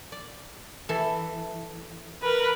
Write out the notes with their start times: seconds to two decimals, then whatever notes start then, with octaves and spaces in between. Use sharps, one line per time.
0.12 D5
0.89 E3 A4
2.22 A#4 B4